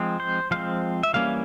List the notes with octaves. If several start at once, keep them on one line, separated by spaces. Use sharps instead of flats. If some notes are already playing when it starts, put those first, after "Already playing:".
Already playing: F3 G#3 C4
C5
F3 G#3 C4 F5
E5
E3 G3 A#3 C#4 F5